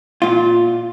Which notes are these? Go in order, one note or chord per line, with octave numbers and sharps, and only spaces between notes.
A#2 F4